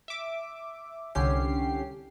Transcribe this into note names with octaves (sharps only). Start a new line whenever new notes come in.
E5 D6
C2 D3 C#4 G4 C7